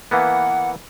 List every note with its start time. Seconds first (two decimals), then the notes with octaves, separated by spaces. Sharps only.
0.11 E3 A#3 B3 F#5